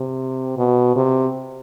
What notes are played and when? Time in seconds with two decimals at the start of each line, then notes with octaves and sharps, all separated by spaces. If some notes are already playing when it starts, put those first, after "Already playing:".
Already playing: C3
0.58 B2
0.96 C3